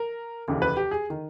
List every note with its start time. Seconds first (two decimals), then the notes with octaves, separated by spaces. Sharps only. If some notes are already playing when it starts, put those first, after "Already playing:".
Already playing: A#4
0.48 F1 D#2 C#3 E3
0.62 B4
0.77 G4
0.91 G#4
1.10 D#3